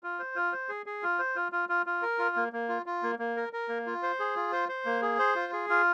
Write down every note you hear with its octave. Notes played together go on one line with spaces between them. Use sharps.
F4
C5
F4
C5
G#4
G#4
F4
C5
F4
F4
F4
F4
A#4
F4
A#3
A#3
F4
F4
A#3
A#3
A#4
A#4
A#3
F4
C5
G#4
F4
C5
C5
A#3
G#4
C5
F4
G#4
F4